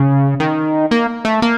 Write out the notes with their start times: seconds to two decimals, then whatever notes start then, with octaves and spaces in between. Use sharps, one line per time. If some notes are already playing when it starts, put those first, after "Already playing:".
Already playing: C#3
0.40 D#3
0.91 A#3
1.25 A3
1.42 A#3